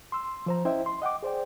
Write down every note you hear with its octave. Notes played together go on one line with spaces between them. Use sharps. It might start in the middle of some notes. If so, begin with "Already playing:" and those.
C6 E6
F3 C5 A#5
C#4 E4 C5 D#5 E5 G5
C6
D#5 F#5 G5 D6
G#4 C5 D5 G5